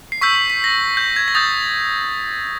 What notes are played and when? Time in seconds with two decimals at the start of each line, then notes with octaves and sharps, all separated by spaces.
0.12 C7
0.21 C#6 E6 G6 B6
0.35 B6
0.50 B6
0.64 A#6
0.97 G6
1.16 G#6
1.28 A#6
1.35 D#6 G6 A6